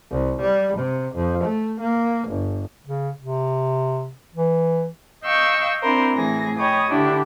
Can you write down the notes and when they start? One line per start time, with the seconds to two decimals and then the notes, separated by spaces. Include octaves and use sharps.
0.11 C2
0.41 G3
0.78 C3
1.15 F2
1.44 A3
1.80 A#3
2.28 G1
2.86 C#3
3.20 C3
4.35 E3
5.23 D#5 F5 G5 C#6 E6
5.82 C4 D4 E4 A#4 C5
6.13 A2 E3 C4 G#4 A#6
6.57 C#5 D#5 G5 B5 D#6
6.88 D3 D4 E4 G4